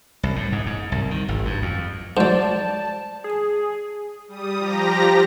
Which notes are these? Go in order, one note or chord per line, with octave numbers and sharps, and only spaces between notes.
C2
A2
G#2
G#2
C2
D#3
G#1
G2
F2
G#2 F#3 C5 D5 A5
G#4
G3 D#6
F3 G4 A#5 A#6